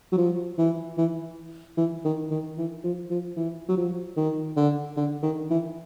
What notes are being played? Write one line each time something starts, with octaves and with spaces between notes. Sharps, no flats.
F#3
F3
E3
E3
E3
D#3
D#3
E3
F3
F3
E3
F#3
F3
D#3
D3
D3
D#3
E3